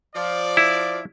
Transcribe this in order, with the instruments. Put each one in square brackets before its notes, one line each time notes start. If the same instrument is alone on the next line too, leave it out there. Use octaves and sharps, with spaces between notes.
[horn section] F3 D5
[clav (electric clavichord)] E4